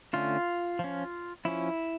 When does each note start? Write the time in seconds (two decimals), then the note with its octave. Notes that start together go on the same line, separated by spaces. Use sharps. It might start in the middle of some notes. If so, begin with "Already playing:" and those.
0.13 D3 A3 C#4 F4
0.79 F3 C#4
1.45 F3 C#4 E4